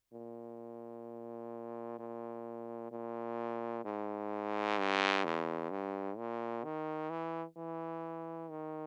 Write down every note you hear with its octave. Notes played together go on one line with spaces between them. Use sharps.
A#2
A#2
A#2
G#2
G2
E2
G2
A#2
D#3
E3
E3
D#3